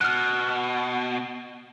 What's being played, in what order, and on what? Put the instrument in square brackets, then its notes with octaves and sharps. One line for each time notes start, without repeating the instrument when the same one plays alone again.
[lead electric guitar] B2 [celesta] F6 F#6